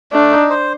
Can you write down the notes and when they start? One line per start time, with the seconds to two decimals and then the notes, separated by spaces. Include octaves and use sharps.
0.12 A3 D4
0.31 D#4
0.50 C5